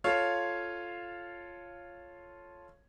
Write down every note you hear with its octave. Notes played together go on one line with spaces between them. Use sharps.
F4 A4 C#5 F5